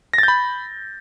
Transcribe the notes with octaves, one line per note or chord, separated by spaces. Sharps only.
B5 G6 A6 A#6